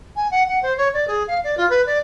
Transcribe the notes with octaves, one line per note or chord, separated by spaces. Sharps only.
G#5
F#5
F#5
C5
C#5
D5
G#4
F5
D5
F4
B4
D5